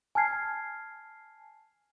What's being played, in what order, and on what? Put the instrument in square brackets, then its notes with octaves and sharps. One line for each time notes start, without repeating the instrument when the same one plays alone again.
[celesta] G#5 A5 F6 G#6 C7